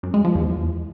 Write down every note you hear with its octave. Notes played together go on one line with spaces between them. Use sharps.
F#2
G#3
F3
E2